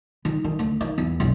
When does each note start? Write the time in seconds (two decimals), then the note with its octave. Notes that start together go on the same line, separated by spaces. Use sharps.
0.25 D#3
0.44 D#3
0.59 D2
0.81 D#3
0.98 E2
1.20 F#1 B1